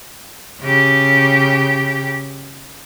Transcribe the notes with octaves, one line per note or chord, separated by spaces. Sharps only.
C#3 G4